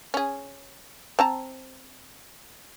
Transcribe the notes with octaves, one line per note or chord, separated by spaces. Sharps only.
C#4 G#4
C4 A5 A#5